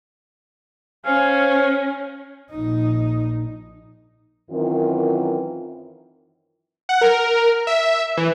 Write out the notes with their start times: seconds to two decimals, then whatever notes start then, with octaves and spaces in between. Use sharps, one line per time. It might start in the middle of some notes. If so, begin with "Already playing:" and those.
1.05 C#4 C5 F5 G#5
2.51 A#1 D#4
4.51 F#2 D#3 E3 C4 F4
6.89 F#5
7.01 A#4
7.67 E5
8.17 E3